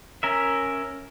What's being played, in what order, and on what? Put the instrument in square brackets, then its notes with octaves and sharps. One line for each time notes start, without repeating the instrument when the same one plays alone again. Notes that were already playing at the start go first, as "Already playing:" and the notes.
[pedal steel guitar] C#4 A#4 E5